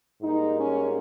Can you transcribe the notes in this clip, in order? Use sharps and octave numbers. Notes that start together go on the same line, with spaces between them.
G#2 G3 A#3 D#4
C#4